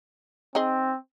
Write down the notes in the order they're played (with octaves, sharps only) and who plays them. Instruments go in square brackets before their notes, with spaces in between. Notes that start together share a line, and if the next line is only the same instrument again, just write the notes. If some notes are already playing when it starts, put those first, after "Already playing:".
[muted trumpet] C4 [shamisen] D#4 G#4 D#5